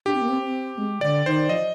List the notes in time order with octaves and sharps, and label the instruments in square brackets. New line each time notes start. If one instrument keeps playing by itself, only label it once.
[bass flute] D4 [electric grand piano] G4
[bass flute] C4
A#3
C4
C4
G#3
[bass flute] D3 [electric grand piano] D5
[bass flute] D#3 [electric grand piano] C5
[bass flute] F3 [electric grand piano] D#5